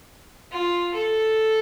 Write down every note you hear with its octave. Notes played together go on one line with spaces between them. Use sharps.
F4
A4